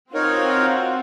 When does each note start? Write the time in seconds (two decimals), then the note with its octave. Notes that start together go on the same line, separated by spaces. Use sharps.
0.14 C4 D#4 F4 F#4 A#4 C#5